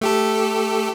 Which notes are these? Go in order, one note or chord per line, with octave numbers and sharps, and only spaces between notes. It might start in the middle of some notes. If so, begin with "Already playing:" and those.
A3 G4 A4